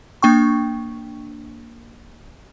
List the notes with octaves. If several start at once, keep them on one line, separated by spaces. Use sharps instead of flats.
A#3 D4 G5 C#6